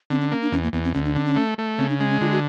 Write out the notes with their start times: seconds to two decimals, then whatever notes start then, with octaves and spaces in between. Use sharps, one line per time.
0.10 D3 C4
0.21 C#4
0.31 A#3 C#4
0.42 D4
0.52 E2 C#4
0.63 A#3
0.73 E2 B3
0.84 C4
0.94 D2 C#4
1.05 D4
1.15 D3 C#4
1.26 C#4
1.36 A3
1.58 A3
1.78 C#3 C4
1.89 D4
2.00 G#3 C#4
2.10 C#4
2.21 D3 F4
2.32 F#4